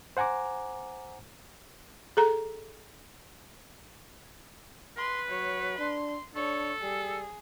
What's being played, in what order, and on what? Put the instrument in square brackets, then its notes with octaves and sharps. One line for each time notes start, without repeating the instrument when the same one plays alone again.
[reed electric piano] C5 F#5 G#5 A#5 D6
[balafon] G#4 A4 A#5
[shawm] B4 [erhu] C6
[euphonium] F#3 [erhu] C#5
[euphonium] D4 [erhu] C6
[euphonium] D4 [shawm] A4 [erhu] C#5
[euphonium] G3 [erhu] G#4